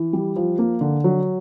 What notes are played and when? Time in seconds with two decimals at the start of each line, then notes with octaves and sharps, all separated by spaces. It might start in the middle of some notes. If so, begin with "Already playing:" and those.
Already playing: E3
0.13 G3
0.36 F3
0.59 A#3
0.81 D3
1.04 F#3